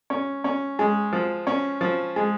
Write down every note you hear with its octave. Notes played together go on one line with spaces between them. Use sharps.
C#4
C#4
G#3
F3
C#4
F3
G#3